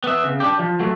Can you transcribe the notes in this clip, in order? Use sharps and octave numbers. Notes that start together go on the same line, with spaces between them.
B3 E5
C#3
D4 G4
F3
F#3 A3